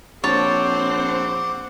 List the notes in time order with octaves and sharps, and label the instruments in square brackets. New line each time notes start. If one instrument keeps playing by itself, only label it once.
[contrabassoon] A#1 [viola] C4 [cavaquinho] C#5 A5 [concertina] F#5 D6